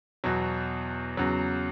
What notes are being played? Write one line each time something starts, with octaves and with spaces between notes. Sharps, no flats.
E2 B2 F#3
E2 C#3 F#3